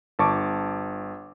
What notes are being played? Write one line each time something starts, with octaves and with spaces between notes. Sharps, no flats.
G1 A5 C#6 D6